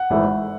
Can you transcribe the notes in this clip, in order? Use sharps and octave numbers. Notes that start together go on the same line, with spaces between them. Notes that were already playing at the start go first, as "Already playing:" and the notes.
Already playing: F#5
G#1 G#2 E3 A3